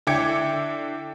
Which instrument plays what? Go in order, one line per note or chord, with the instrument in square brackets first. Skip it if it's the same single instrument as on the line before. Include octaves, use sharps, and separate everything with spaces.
[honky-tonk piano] D3 E4 G5 D6 G#6 C#7